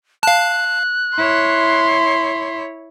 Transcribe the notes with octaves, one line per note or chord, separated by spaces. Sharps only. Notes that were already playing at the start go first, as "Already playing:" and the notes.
F5 A5 F#6
E4 C#5 C6